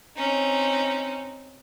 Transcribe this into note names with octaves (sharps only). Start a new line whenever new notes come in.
C4 C#4 D#4